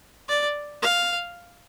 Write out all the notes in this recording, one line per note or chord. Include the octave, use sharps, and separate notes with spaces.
D5
F5